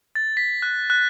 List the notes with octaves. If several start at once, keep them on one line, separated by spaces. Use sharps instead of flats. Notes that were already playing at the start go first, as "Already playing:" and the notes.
A6
B6
F#6
F#6